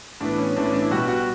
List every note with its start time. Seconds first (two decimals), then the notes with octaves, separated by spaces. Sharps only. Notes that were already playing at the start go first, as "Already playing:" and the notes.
0.20 A2 E3 B3 D4
0.38 C#4
0.56 A2 E3 B3 D4
0.65 C#4
0.74 D4
0.82 E4
0.91 B2 G3 B3 F#4
1.08 F#4